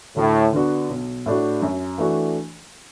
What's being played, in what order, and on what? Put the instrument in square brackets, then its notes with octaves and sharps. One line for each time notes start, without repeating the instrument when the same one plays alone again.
[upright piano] D2 [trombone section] A2
[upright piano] D3 B3 D4 F#4
B1
A2 A3 D4 F#4
F#2
E3 A3 D4 F#4